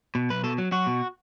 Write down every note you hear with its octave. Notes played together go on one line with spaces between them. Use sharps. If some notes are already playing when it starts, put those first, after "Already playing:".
B2
B1 B4
B2 A4
F#3
F#3 F#4
B2